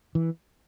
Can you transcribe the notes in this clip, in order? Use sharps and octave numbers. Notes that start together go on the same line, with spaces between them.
E3